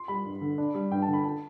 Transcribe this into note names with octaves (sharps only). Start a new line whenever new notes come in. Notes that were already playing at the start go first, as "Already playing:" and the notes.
Already playing: C6
G3 B5
G2
D3
D4
G3
G2 G5
A5
D3
B5
A5